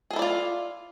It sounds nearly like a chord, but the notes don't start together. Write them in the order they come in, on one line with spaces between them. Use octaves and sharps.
G#4 A4 E4 D5 F4